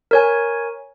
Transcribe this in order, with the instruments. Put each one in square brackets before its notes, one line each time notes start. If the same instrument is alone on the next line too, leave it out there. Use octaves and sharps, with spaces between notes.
[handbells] A#4 C#5 G#5